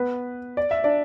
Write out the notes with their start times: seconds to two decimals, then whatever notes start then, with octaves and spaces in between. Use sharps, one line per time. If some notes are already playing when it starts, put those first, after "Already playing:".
Already playing: B3 B4
0.57 D5
0.71 E5
0.84 D4 D5